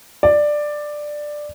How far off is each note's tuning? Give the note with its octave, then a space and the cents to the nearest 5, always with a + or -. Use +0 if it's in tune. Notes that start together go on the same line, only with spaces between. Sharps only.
D5 +10